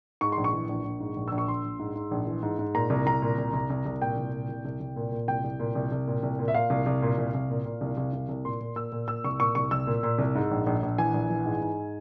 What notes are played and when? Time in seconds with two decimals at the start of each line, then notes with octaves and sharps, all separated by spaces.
0.21 G#2 C#6
0.32 C6
0.37 A#1
0.44 C#6
0.53 E3
0.69 A#1
0.84 A#1
1.00 G#2
1.16 A#1
1.28 A#1 E6
1.38 C#6
1.48 A#1 C6
1.64 A#1
1.79 G#2
1.95 G#2
2.11 A#1
2.27 E3
2.43 G#2
2.59 G#2
2.75 A#2 A#5
2.90 C2
3.06 C2 A#5
3.22 A#2
3.38 C2
3.53 C2
3.70 C2
3.86 C2
4.02 A#2 G5
4.17 C2
4.32 A#2
4.49 C2
4.65 C2
4.80 C2
4.96 A#2
5.12 A#2
5.28 C2 G5
5.44 C2
5.60 A#2
5.75 C2
5.91 C2
6.07 A#2
6.23 C2
6.39 A#2
6.48 E5
6.54 A#2 F5
6.70 C2
6.86 C2
7.02 A#2
7.18 C2
7.34 C2
7.49 A#2
7.65 A#2
7.81 C2
7.97 C2
8.13 C2
8.29 C2
8.45 A#2 C6
8.61 A#2
8.76 A#2 E6
8.92 A#2
9.08 A#2 E6
9.24 C2 C#6
9.40 A#2 C#6
9.55 C2 C#6
9.71 C2 E6
9.87 A#2
10.03 A#2
10.19 C2
10.35 G#2
10.51 A#1
10.66 A#1
10.83 A#1
10.98 E3 G#5
11.14 A#1
11.30 E3
11.46 G#2
11.61 G#2